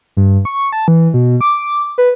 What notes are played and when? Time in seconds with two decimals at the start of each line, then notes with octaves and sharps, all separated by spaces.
0.17 G2
0.45 C#6
0.73 A5
0.88 E3
1.14 B2
1.41 D6
1.98 B4